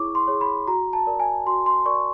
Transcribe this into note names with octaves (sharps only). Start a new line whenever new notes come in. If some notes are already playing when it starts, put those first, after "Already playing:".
Already playing: E4 G#4 C#5 C#6 D6
C6
G#4 C#5
B5
F#4 A#5
A5
A#4 D5
G#5
F#4 C6
C6
A#4 D5 C#6